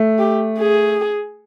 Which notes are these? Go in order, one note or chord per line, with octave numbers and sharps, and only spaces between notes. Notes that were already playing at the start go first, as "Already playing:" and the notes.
Already playing: A3
G4
G#4